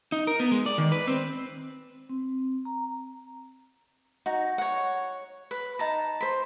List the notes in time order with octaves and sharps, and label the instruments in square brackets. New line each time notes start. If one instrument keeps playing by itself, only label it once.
[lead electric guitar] D#4
A#4
B3
G#3
D5
D#3
B4
C4
[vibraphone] C4
A#5
[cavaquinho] D#4 F#4
C#5 F#5
B4
D#4 A5 A#5
C5 B5